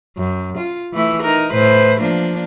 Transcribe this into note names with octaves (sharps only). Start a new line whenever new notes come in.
F#2
F4
E3 A3 E4
D#4 A#4
A2 B4 C5
F3 A#3 D4